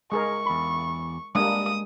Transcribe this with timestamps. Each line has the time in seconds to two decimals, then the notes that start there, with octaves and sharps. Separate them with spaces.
0.12 G#3 G#4 A#4 C#6
0.46 E2 B5
1.35 G3 G#3 A#3 D4 D#6